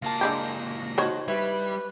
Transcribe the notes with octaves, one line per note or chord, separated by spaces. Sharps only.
C#2 A#3 F4 A5 A#6
D3 G#3 G4
D#3 F#4 C5 C#5 A5
G3 E4 B4